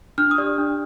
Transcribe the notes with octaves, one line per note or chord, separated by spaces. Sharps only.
D4 F6
D#6
G4 D5
D4